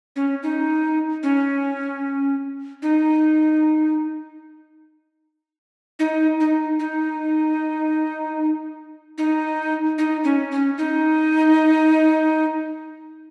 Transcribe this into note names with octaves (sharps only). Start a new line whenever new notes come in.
C#4
D#4
C#4
D#4
D#4
D#4
D#4
D#4
D#4
C#4
C#4
D#4